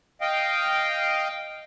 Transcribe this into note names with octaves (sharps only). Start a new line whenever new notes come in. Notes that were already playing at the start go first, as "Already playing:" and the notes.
D#5 F5 G5